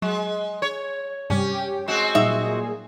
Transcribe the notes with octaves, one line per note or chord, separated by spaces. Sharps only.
F#3 G#3
C#5
G2 C3 G3 C#4 G4
G#3 C4 F#4
A#2 F#3 G3 D#4 G#4 E5